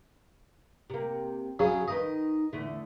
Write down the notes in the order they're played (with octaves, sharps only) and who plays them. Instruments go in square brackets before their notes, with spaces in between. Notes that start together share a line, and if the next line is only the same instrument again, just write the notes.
[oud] C3 A#3
[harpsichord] C#3 F#3 C#4 [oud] G#4
[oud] D#3 D#4 B4 [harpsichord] D#5
[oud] E2 D3 A3